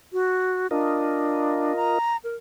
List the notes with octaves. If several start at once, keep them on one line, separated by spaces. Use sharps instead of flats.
F#4
D4 F4 A#4 D#5
A#5
A#4